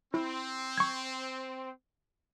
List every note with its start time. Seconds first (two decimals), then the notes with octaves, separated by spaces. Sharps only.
0.14 C4 E4
0.78 C#6 G#6